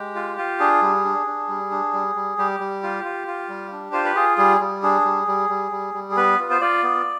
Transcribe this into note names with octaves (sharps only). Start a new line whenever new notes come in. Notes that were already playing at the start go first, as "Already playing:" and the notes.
Already playing: G#3 G4
F4
F4
D4 G#4
G3
D4
D4
G3
D4
G3
G3
G3 G4
G3
F4
F4
F4
G3
D4
F4 C5
B4
F4 G#4
G3 G#4
G3
D4 G#4
G3
G3
G3
G3
G3
G#4
B3 B4
F4
C5
F4 D5
B3